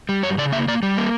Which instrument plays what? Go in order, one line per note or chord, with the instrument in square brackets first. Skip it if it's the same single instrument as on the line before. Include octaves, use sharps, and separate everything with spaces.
[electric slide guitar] G3
F#2 C#5
C#3 D5
A#3 E5
A#3 D5
G3
A#3